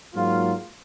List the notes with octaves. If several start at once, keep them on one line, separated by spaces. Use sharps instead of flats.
G#2 F#3 A#3 F4